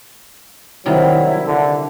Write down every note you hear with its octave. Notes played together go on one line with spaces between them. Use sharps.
C3 D#3 F#3 G3 E4
D3